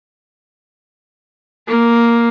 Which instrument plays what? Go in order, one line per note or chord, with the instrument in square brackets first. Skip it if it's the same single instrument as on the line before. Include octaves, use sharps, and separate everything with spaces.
[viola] A#3